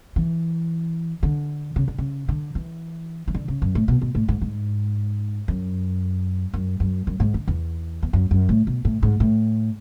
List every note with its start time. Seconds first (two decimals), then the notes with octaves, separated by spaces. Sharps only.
0.16 E3
1.23 D3
1.76 C#3
1.88 D3
1.98 C#3
2.28 D3
2.55 E3
3.28 E3
3.35 D3
3.48 C#3
3.62 F#2
3.75 A2
3.88 B2
4.02 B2
4.15 A2
4.28 G#2
4.41 G#2
5.48 F#2
6.54 F#2
6.80 F#2
7.07 F#2
7.20 G#2
7.34 D3
7.48 E2
8.03 E2
8.13 F#2
8.31 F#2
8.49 A2
8.67 B2
8.85 A2
9.03 G#2
9.20 A2